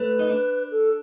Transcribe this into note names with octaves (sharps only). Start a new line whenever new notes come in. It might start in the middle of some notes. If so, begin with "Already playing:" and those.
Already playing: A3 B4
D#4
D4
A4